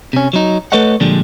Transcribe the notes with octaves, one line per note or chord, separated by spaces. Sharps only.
C3 C#4
F#3 D#4
A3 A4 B4 C#5 D#5 F#5
A#2 D3 F3 G3 G#3 D4